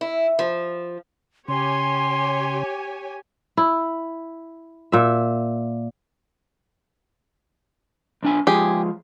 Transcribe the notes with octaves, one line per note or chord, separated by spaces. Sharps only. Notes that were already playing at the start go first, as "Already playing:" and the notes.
E4
F3
C#3 G4 C#5 G#5 C6
E4
A#2 E5
B1 D4 G#5
F3 G#3 G4 G#4